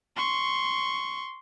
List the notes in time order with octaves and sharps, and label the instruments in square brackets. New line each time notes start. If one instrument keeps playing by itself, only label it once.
[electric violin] C6 C#6